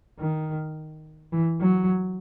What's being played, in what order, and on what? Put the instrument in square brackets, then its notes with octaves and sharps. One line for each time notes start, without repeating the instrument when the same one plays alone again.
[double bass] D#3
E3
F#3